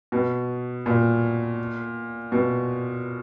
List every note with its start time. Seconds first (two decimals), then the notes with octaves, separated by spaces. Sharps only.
0.12 B2
0.86 A#2
2.32 B2